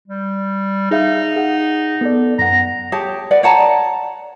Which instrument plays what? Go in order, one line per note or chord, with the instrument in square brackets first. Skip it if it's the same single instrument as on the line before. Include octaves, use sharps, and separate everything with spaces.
[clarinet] G3
[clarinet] D#4 [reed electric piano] G#4 E5 F5
[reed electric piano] G#4 F#5
B3 A4 D5
[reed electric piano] F#2 F#5 [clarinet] A#5
[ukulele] G4 G#4 C#5 A5
B4 D5 F#5
C#5 F#5 A5 A#5